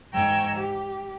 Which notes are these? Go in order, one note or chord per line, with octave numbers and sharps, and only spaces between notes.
G#2 G5 A#5 C#6 E6 G#6
G4